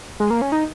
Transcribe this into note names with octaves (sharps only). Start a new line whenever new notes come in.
G#3
A#3
C#4
D#4